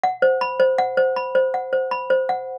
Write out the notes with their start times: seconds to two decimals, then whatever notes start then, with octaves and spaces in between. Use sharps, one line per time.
0.04 F#5
0.22 C5
0.41 B5
0.60 C5
0.78 F#5
0.97 C5
1.16 B5
1.35 C5
1.54 F#5
1.73 C5
1.91 B5
2.10 C5
2.29 F#5